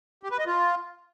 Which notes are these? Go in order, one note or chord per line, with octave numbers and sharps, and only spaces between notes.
G4
B4
D#5
F4